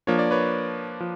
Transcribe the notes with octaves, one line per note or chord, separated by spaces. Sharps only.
F3 A#3 D4 C#5
D5
B4 C#5
F3